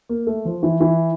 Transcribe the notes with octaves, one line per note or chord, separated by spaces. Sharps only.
A#3
A3
F3
E3
E3